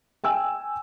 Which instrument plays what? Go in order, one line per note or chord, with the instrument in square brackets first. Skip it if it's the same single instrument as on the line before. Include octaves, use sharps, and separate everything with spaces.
[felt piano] G5 G#5 E6